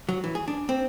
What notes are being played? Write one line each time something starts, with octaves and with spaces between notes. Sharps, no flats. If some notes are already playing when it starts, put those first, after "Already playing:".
F#3
E3
G#4
D4
C4